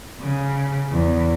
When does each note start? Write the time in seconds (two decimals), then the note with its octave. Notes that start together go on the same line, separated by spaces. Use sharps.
0.20 C#3
0.90 E2